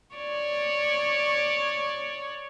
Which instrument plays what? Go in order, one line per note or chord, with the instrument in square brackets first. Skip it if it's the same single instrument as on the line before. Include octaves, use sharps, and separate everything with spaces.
[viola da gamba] C#5 D5